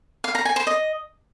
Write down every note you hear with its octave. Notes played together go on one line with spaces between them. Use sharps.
F5
A#5
G#5
C5
D#5